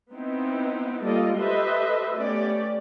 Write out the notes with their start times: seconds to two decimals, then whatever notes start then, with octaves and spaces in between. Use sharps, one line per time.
0.11 B3 C4 D#4 E4
1.04 G3 A#3 F4 A4 D5 D#5
1.37 G4 A4 B4 C5 D#5 E5
2.15 A3 B3 C#4 G4 D5